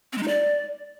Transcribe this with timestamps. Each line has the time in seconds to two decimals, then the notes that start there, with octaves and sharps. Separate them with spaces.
0.12 C4
0.17 G#3
0.22 D#4
0.28 D5